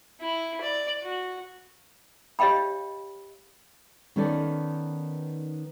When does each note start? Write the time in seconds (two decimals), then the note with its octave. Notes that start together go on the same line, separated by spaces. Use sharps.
0.21 E4
0.62 D5
1.02 F#4
2.39 G4 C#5 D#5 F5 G5 B5
4.16 D#3 B3 C#4 D#4 A4 D5